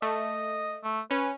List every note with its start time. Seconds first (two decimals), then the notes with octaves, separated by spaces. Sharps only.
0.02 A3 D#5
0.84 A3
1.11 C#4 B4